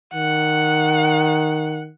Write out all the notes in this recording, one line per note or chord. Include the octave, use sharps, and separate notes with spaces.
D#3 F#5